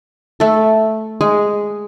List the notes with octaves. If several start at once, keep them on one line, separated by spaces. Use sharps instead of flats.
A3 A4
G#3 G#4